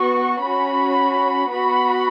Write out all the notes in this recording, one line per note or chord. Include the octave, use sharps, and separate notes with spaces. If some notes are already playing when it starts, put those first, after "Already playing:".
Already playing: B3 F#4 C#6
C#4 F#4 B5
B3 F#4 B5